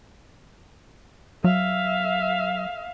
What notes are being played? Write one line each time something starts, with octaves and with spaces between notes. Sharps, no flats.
F#3 E5 F5